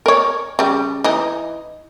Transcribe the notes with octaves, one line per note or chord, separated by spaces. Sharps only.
A#4 C#5
C#3 G3
E3 D#4